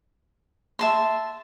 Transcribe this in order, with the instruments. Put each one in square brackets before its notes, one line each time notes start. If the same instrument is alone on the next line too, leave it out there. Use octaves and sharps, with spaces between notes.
[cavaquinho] E5 A5 C6